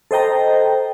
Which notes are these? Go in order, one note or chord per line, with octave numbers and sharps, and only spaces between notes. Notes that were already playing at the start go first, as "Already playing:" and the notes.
A4 C5 D#5 G5 A#5